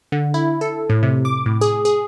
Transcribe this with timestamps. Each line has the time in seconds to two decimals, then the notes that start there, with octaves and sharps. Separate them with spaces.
0.12 D3
0.34 E4
0.61 A4
0.90 A2
1.03 C3
1.25 D6
1.46 A2
1.61 G#4
1.85 G#4